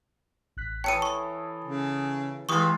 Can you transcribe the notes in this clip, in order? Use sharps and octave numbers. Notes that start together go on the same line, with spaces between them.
A1 F#6 B6
E3 A4 C#5 G5 A5 D#6 C#7 D#7
C#6
C#3
E3 G#3 F4 G4 C#6 D#6